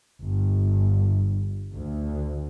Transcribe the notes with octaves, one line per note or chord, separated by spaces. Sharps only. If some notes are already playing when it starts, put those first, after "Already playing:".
G1
D2